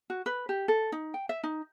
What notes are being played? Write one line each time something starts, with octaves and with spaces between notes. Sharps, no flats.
F#4
B4
G4
A4
D#4
G5
E5
D#4